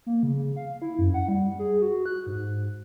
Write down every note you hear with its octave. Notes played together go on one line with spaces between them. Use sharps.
A#3
C#3
F5
E4
F#2
F#5
G3
G#4
F#4
F#6
G#2